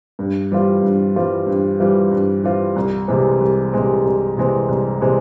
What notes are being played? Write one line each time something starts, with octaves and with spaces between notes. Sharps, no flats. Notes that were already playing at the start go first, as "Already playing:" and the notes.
G2
E3 G3 C4 F4
G2
E3 G3 C4 F4
G2
E3 G3 C4 F4
G2
E3 G3 C4 F4
C2
C3 E3 G#3 C4
C2
C3 E3 G#3 C4
C2
C3 E3 G#3 C4
C2
C3 E3 G#3 C4